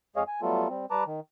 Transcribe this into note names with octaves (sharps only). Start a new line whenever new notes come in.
F2 G#3 G#4 C#5 D#5 F5
G#5
F#3 G3 A3 B3 F4 A4
G3 C4
G3 B4 A5 A#5 D6
D#3